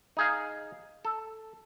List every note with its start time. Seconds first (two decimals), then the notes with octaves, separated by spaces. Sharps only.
0.17 D#4 G#4 F5
1.05 A4